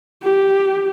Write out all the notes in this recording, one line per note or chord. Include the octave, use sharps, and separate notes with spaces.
G4